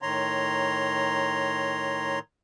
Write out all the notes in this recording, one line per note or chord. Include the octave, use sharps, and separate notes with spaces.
A2 D#3 C#5 A#5 C6